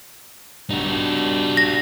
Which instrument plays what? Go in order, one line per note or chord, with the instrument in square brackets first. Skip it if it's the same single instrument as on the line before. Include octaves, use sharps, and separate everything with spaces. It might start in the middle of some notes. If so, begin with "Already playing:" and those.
[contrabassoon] G2 [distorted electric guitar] D#4 F#4
[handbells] A#6